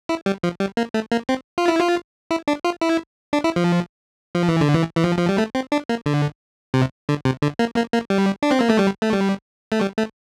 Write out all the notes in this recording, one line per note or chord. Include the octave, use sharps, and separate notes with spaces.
E4
G3
F3
G3
A#3
A3
A#3
C4
F4
E4
F4
E4
D4
F4
E4
D4
E4
F3
F3
E3
D3
E3
E3
F3
F3
G3
A3
C4
D4
A#3
D3
C3
D3
C3
D3
A#3
A#3
A#3
G3
D4
C4
A#3
A3
G3
A3
G3
A3
G3
A3